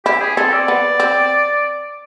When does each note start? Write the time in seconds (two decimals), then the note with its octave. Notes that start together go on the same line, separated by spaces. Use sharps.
0.05 E4 G4
0.22 G#4
0.37 C4 A4
0.53 D5
0.68 B3
1.00 C4